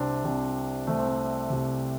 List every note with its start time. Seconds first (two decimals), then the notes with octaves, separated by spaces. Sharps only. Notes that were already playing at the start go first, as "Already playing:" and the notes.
Already playing: C2 C3 C4 D4
0.25 C2 C3
0.87 C2 C3 A3
0.98 C4
1.08 A3
1.50 C2 C3